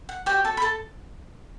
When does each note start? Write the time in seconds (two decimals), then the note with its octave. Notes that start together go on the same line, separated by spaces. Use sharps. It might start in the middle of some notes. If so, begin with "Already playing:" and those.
0.09 F#5
0.26 F#4 G4 C#5 G5
0.45 A4 A5
0.57 B5
0.62 A4 A5